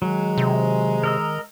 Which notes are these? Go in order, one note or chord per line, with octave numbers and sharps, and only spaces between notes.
D#3 F#3 G#3 A#5
C3
A#4 D#5 E6